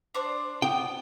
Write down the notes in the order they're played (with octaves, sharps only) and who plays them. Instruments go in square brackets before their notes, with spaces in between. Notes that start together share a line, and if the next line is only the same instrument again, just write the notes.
[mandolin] D4 C5 D5
[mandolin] B3 [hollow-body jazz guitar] G5